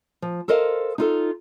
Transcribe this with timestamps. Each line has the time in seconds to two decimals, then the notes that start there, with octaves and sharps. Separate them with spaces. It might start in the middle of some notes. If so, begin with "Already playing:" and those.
0.22 F3
0.48 A4 A#4 C5 D#5 F5
0.98 D#4 F4 A4